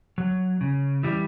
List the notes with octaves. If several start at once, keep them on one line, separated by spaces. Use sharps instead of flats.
F#3
C#3
E3 G3